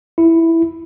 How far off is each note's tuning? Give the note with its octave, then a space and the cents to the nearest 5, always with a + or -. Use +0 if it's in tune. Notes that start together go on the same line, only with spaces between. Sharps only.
E4 +0